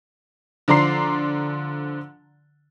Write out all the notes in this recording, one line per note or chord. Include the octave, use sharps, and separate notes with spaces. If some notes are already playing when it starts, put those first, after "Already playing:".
D3 F3 D5 A#5 C6 C7